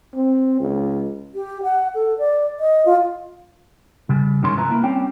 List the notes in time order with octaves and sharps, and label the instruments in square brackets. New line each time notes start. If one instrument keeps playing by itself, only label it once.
[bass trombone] C4
C#2
[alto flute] G4
F#5
A4
D5
D#5
F4
[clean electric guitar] C#3 G3
G2 D#3 G#3 C#4 C#5 C6
C2 F3 E4 B4 A#5
A#3 E4
G3 C4 C#4 G5